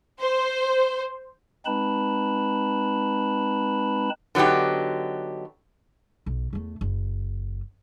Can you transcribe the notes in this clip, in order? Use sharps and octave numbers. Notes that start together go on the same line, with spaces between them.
C5
G#3 C4 D#4 B4 A5 B5
D3 F#3 B3 D#4 G4
B1
E2 A3
F#1